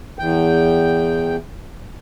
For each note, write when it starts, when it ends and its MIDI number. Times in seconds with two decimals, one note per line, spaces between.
0.19 1.36 40
0.19 1.36 79